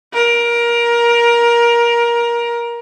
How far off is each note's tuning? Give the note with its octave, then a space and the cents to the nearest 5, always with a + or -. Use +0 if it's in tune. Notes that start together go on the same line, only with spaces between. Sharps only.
A#4 +20